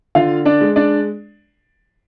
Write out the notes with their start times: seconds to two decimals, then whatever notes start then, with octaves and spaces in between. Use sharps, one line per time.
0.15 D3 F4 F5
0.45 D4 D5
0.61 G#3
0.76 D4 D5